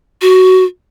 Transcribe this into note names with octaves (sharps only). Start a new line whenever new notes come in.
F#4